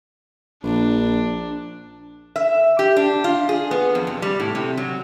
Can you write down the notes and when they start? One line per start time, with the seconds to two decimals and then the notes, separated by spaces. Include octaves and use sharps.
0.64 A#1 D4
2.36 E5
2.79 G4
2.96 D4
3.24 F4
3.49 G#4
3.71 B3
3.95 F2
4.07 C3
4.22 G3
4.40 A2
4.55 C3
4.77 F#3